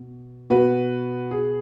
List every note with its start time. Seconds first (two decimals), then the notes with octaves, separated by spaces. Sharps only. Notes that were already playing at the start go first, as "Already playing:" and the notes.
Already playing: B2
0.50 B2 B3 F#4 B4
1.31 G#4